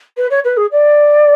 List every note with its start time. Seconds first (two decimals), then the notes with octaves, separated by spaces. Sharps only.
0.17 B4
0.30 C#5
0.44 B4
0.56 G#4
0.71 D5